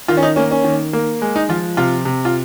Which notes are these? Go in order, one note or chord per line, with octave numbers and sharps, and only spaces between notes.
D#3 F4
C#4
D#4
A#3 C#4
C#4
D#3
A#3
G#3
D#4
F3 F4
C3 F4
C3
F4